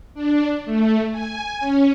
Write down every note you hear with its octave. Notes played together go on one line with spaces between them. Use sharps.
D4
A3
G#5
C#4